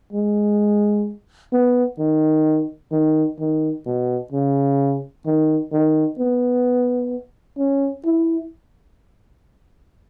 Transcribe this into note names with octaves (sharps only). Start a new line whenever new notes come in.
G#3
B3
D#3
D#3
D#3
B2
C#3
D#3
D#3
B3
C#4
E4